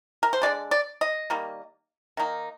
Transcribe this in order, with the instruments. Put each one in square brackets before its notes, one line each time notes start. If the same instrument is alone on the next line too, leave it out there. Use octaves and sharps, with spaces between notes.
[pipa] A#4
C5
D3 G#3 D4 D5
D5
D#5
D#3 G3 A#3
D#3 A#3 D#4